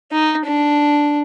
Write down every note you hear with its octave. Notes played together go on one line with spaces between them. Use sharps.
D#4
D4